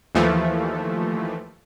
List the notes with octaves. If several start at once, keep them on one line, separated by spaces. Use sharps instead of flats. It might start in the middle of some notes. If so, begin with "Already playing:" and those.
D#2 E3 F3 A3